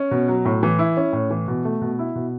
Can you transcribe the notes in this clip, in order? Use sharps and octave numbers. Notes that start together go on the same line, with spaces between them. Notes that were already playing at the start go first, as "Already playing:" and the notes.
Already playing: C#4
B2
F#3
A2
E3
E4
C#4
A2
E3
B2
A3
B2
E4
B2